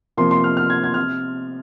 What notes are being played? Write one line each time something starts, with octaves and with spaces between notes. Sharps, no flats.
C3 F3 A#3 C6
C6
F6
F6
G#6
G#6
C3 F6